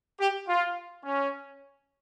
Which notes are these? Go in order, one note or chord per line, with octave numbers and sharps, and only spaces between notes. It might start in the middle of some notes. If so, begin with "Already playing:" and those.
G4
F4
C#4